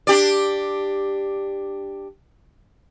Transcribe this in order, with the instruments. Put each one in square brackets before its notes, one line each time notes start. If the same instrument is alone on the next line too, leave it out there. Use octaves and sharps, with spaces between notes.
[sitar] D4 G4 D5